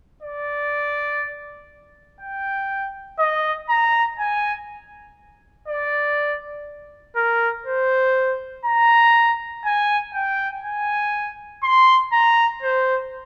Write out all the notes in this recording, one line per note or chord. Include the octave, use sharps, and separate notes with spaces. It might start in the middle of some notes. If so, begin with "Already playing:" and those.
D5
G5
D#5
A#5
G#5
D5
A#4
C5
A#5
G#5
G5
G#5
C6
A#5
C5